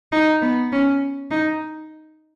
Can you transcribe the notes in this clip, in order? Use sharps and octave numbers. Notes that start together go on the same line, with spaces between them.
D#4
B3
C#4
D#4